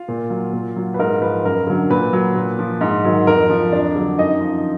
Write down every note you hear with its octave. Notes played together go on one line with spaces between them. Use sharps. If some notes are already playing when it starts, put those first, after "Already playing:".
Already playing: F4 F5
A#2
F#3
A#2
F#3
B4
G#2 A#4
F3 B4
F#2 A#4
D3 F#3
A#2 B4
F#3
A#2
F3
G#2
D#3 F#3
F2 A#4
F3
F2 D4 D5
D3 F#3
F#2 D#4 D#5
F3